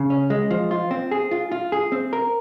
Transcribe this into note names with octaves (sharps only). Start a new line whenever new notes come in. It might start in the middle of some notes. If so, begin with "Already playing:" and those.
Already playing: C#3
C#4
G#3
F3
F4
C4
G#4
F4
F4
G#4
C4
A#4